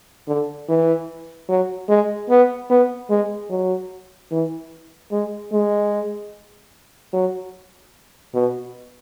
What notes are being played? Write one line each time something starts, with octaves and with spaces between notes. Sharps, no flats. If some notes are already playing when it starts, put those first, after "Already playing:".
D3
E3
F#3
G#3
B3
B3
G#3
F#3
E3
G#3
G#3
F#3
B2